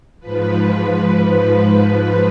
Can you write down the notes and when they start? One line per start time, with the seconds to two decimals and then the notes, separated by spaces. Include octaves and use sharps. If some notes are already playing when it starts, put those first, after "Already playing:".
0.20 G#2 F3 B4
1.86 B4